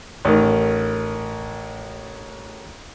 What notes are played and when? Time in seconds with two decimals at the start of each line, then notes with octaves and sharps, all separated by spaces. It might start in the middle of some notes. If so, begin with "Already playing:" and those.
0.25 A1 D#3